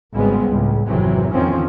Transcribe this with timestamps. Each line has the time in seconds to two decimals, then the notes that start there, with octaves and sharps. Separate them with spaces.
0.14 G#1 C#3 G3 G#3 B3 C4
0.47 C#2 A2
0.87 G#1 F2 C3 E3 F#3
1.32 E2 D3 D#3 F3 C4 C#4